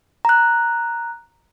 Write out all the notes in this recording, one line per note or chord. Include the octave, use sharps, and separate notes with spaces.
A#5 F#6